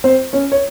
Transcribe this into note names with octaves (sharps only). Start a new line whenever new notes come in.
C4 C5
C#4 C#5
C#5